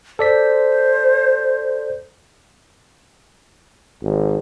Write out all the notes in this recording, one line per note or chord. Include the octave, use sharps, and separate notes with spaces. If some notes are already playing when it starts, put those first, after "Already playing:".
A4 C5 D5 B6
G#1